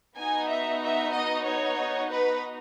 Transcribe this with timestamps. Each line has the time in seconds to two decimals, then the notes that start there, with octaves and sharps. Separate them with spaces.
0.17 B3 D#4 F#4 G#5
0.49 E5
0.82 E5
1.13 D#5
1.45 C#5
2.10 B4